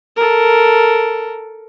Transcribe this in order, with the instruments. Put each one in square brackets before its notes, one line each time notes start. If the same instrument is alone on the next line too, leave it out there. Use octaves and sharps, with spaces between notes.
[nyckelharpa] A4 A#4